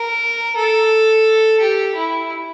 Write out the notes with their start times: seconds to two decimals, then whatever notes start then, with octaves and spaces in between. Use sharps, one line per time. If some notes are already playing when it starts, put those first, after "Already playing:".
Already playing: A#4
0.57 A4
1.61 G4
1.95 E4